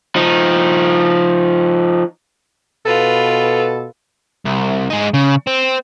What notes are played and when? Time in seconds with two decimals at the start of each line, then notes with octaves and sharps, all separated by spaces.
0.16 F3 D#4
2.86 B2 F4 A4 B4
4.46 C2
4.90 G#3 D#4
5.14 C#3
5.47 C4